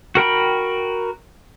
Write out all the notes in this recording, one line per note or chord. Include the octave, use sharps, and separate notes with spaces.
F#4 A#4 G5 B5